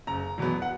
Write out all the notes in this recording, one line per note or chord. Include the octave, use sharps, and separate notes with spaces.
F#1 A#5
E2 B2 F#3 B3
F#5